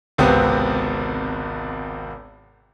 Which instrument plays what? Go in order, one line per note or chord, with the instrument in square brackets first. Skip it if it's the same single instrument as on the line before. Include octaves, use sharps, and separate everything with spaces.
[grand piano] G#1 C#2 C3 B3 C4 D#6